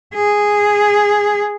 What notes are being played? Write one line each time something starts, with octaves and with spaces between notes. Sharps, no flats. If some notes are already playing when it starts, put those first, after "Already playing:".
G#4